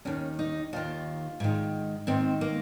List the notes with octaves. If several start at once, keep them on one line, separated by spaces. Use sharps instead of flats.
D#2 D#3 C#4
D#4
D#2 D#3 F4
G#2 D#3
G#2 D#3 C4
A#3